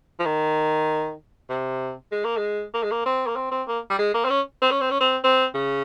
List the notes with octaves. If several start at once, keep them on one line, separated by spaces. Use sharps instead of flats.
F3
D#3
C3
G#3
A#3
G#3
A#3
G#3
A#3
C4
A#3
C4
C4
A#3
G3
G#3
A#3
C4
C#4
C4
C#4
C4
C#4
C4
C4
C#3